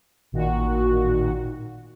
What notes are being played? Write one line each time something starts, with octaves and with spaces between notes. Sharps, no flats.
A1 A#2 D#3 F#4